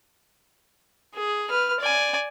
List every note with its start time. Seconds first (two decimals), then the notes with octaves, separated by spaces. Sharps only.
1.14 G#4
1.49 B4 F6
1.80 D5 G#5